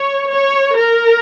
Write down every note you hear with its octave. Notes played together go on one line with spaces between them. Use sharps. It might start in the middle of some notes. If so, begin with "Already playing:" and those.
Already playing: C#5
C#5
A#4